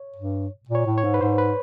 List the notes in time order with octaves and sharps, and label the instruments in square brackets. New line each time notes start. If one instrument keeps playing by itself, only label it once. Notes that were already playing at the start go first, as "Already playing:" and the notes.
Already playing: [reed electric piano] C#5
[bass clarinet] G2
A#2
[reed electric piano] C#5
[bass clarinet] A2
[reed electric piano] C#5
[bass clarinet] G#2
[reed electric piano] B4
[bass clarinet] G#2 [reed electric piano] C5
[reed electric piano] B4